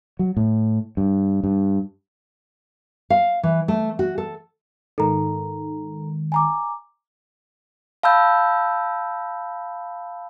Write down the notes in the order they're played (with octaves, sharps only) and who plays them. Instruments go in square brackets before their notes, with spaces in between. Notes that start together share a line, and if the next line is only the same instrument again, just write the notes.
[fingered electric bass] F#3
A2
G2
G2
[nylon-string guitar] F5
E3
A3
F#4
A4
[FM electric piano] G#2 D#3 [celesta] A4 A#5
[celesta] G#5 A#5 D6
[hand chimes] F5 A5 B5 E6 G6